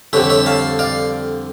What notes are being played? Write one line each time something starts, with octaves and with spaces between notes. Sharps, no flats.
F2 D3 G3 C#5 E5
C#5 E5
F5 A5
D5 F5